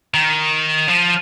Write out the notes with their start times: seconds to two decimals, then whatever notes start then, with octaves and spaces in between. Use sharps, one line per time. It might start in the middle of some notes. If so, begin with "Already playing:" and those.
0.14 D#3
0.88 F3